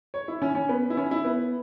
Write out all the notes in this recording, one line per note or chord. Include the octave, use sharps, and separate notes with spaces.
C#5
E4
C#4
C#4
B3
E4
C#4
E4
B3